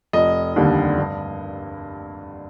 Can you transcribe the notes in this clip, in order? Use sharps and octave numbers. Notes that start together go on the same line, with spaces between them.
F1 D#5
D#2 D3 G3
G2